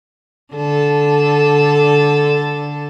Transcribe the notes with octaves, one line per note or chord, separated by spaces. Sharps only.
D3 A4